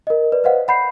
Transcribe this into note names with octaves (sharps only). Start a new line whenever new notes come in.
A#4 D#5
B4 D5
B4 C5 D#5 F5 F#5
F#5 B5 G6 C7